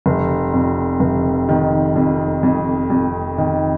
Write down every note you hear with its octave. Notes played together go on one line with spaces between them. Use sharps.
F1
F2
F1
D#3
F2
F2
F2
D#3